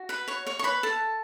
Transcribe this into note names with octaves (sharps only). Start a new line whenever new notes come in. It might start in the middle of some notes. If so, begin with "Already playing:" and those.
Already playing: F#4
B4 B5
C#5 C#6
C#5 C#6
C#6
B4 B5
A4 A5